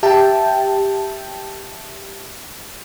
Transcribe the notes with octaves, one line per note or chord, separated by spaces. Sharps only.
G4 E5 G5 A5